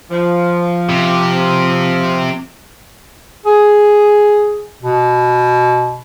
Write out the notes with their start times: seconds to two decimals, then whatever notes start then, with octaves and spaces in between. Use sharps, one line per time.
0.11 F3
0.89 C3
3.46 G#4
4.83 B2